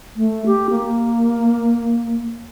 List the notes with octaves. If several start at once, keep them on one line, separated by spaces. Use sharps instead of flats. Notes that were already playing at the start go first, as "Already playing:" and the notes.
A3
G4
A#3